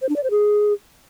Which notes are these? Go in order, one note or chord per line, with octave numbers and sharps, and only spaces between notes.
C5
D4
D5
C5
G#4